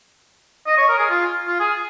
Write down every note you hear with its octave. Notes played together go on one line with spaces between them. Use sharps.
D#5
C#5
A#4
G#4
F4
F4
G#4